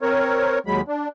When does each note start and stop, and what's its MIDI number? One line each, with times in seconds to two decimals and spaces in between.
0.01 0.59 60
0.01 0.59 70
0.01 0.59 73
0.66 0.81 39
0.66 0.81 54
0.66 0.81 56
0.66 0.81 83
0.88 1.08 62